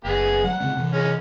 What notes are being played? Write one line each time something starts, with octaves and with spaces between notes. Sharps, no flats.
F#1 G#3 B3 G#4
F#3 G3 F#5
C#3 G#3 C4
C3 E3
G#3 C#4 F6